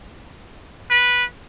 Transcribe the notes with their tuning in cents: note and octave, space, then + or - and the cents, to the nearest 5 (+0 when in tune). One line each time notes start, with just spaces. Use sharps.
B4 -10